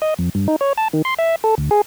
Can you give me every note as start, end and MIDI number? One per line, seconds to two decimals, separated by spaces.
0.02 0.14 75
0.19 0.29 41
0.35 0.48 43
0.48 0.56 63
0.61 0.73 73
0.78 0.88 81
0.93 1.02 51
1.05 1.14 84
1.19 1.36 76
1.44 1.55 69
1.58 1.69 38
1.71 1.81 68